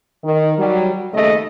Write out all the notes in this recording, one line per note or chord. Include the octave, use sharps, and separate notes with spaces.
D#3
F#3 G3
D#2 C#3 A3 D#5